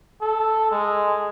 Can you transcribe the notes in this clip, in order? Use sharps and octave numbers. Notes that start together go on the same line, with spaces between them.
A4
G#3